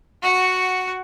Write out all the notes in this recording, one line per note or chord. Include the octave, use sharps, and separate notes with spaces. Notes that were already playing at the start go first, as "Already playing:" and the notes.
F#4 F#5